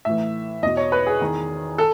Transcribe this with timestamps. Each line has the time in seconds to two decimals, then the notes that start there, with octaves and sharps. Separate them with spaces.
0.05 A2 E3 E5
0.63 E2 B2 D#5
0.77 C#5
0.92 B4
1.07 G#4
1.21 E2 D#3
1.78 A4